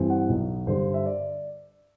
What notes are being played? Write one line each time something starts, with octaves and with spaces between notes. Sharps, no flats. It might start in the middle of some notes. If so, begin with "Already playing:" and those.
Already playing: G2 E3 G3 C4
F#5
B1 B2 F#3 B3
G2 D3 G3 C5
E5
D5